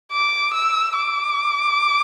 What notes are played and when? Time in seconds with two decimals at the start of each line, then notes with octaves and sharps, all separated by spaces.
0.13 D6
0.54 E6
0.97 D6